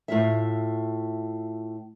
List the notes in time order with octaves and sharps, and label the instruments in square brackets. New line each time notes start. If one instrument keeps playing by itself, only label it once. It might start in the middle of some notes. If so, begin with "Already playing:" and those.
[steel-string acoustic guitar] A2 F4 E5